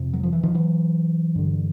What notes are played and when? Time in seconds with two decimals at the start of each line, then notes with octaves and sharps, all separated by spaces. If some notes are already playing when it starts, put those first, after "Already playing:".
Already playing: F2 C3
0.13 F#3
0.23 F3
0.33 E3
0.43 D#3 F3
0.54 E3 F#3
1.35 G2 D3